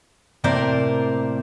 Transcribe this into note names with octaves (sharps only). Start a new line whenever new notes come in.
A2 C3 A#3 A#4 C5 D5